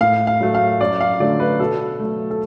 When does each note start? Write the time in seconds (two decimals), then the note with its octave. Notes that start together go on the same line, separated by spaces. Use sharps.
0.01 A2 F5
0.27 F5
0.41 F#3 A3
0.55 F5
0.81 F#2 D5
1.00 F5
1.20 D3 F#3 A3 D5
1.40 B4
1.60 B2 A4
2.00 F#3 A3
2.31 A4